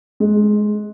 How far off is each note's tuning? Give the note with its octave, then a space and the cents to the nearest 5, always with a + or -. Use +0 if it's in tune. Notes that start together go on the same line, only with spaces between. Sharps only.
G#3 +15